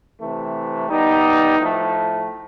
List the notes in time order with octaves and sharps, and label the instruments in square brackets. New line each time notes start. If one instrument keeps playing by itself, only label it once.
[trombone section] C3 E3 A3
G3 B3 D#4
A2 F3 A3